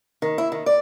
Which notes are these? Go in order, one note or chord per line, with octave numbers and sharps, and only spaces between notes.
D#3
E4
D#3
D5